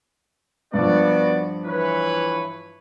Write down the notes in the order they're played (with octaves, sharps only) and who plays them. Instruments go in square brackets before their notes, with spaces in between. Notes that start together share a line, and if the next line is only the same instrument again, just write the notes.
[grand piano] G2 F3 [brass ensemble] B3 F#4 D5
[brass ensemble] E3 B4 C#5